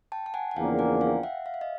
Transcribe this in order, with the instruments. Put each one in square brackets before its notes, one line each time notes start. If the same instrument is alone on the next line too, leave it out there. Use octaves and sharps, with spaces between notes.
[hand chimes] G5 A5
A5
F#5 G#5
F#5
[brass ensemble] E2 C#3 F3 A#3 D4 [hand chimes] F5 G5
[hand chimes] F#5 G#5
F5 G5
E5 F#5
F5
E5
D#5 F5